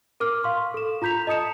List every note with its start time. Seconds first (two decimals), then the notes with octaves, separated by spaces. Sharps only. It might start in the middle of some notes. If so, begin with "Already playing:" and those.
0.20 A#4 D6 F6
0.44 F5 C6 C#6
0.74 A4 E7
1.02 F4 A#5 G6 B6 F7
1.27 D#5 A5 D#6 C#7 E7